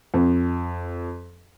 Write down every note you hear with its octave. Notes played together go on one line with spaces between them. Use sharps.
F2